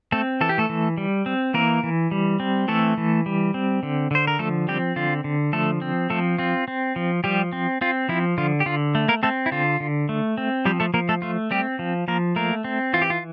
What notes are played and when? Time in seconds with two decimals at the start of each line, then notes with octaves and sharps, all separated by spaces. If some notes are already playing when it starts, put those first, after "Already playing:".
0.12 A3 C4 A4
0.41 E3 A4
0.49 G4
0.58 A3 A4
0.69 E3
0.97 G3
1.26 C4
1.54 E3 A#3 A#4
1.83 E3
2.11 G3
2.40 C4
2.68 E3 A3 A4
2.97 E3
3.26 G3
3.54 C4
3.83 D3
4.11 D3 C5
4.27 A#4
4.39 F3 A3 A4
4.68 G3 C4 G4
4.96 D3 F4
5.24 D3
5.53 F3 A3 A4
5.82 C4
6.10 F3 A3 A4
6.38 C4 F4
6.68 C4
6.96 F3
7.24 F3 G3 G4
7.53 C4
7.81 C4 F4
8.09 F3 E4
8.38 D3 F4
8.60 G4
8.66 D3 F4
8.95 A3
9.08 A#3 A#4
9.23 A3 C4 A4
9.46 E4
9.52 D3 F4
9.80 D3
10.09 A3
10.38 C4
10.65 F3 G3 G4
10.80 A3 A4
10.94 F3 A#3 A#4
11.09 A3 A4
11.22 A3 F4
11.51 G3 C4 G4
11.79 F3
12.08 F3 A#3 A#4
12.36 A3 A#3 A#4
12.64 C4
12.93 E3 F4
13.02 G4
13.10 F4